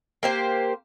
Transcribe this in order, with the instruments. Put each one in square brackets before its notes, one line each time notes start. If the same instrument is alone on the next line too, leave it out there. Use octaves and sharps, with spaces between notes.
[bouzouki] A#3 G4 C5